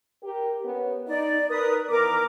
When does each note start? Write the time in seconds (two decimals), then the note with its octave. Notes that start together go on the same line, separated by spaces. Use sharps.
0.23 G4 A#4
0.65 B3 C#4
1.08 D#4 D5
1.50 A#4 B4 D#6
1.90 D#3 E3 B3 A#4 D6